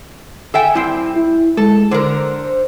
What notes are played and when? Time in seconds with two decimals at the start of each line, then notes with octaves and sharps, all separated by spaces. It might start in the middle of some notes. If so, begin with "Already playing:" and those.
0.54 A4 E5 G5 G#5
0.75 G3 C4 E4
1.16 E4
1.57 G#3 A4
1.91 D3 A#4 C5